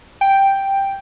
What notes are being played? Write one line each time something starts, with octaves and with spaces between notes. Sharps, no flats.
G5